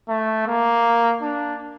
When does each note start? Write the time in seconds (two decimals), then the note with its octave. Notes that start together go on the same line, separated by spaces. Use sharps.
0.09 A3
0.47 A#3
1.22 D4